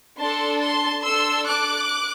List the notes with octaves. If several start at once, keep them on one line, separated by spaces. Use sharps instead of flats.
D4 A4 A5 C6
A5 C6
D4 A4 C6 E6
D6 F#6